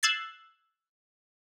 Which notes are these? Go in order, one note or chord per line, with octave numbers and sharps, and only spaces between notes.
E6 F#6 G#6 A6 C7